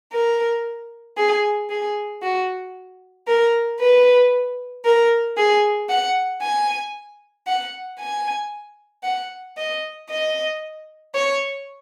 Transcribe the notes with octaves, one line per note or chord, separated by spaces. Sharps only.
A#4
G#4
G#4
F#4
A#4
B4
A#4
G#4
F#5
G#5
F#5
G#5
F#5
D#5
D#5
C#5